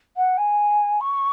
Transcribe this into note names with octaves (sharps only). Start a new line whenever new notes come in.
F#5
G#5
C#6